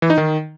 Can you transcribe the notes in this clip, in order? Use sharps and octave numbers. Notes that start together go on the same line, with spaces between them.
E3
D#4
D#3